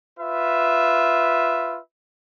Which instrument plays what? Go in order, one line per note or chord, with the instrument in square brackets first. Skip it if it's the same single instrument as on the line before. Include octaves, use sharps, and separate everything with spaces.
[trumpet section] F4 B4 E5